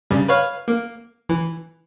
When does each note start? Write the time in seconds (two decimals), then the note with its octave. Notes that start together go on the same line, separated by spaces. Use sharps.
0.11 G2 C#3 G3
0.28 B4 C#5 F5
0.68 A#3
1.29 E3